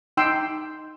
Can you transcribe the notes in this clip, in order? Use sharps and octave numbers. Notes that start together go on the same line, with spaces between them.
D#4 G5 C6 E6